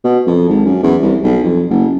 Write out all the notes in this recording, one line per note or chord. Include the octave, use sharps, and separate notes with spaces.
B2
F2
G#1
F#2
E2
C2
B1
F2
F#1